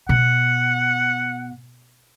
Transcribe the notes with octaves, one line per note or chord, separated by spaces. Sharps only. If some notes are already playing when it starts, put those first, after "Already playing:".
B2 F#5